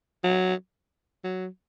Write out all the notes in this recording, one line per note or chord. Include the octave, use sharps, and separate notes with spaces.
F#3
F#3